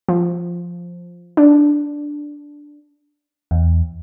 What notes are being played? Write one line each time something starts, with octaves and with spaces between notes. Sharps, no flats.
F3
D4
E2